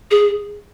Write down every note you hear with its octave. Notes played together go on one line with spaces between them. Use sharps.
G#4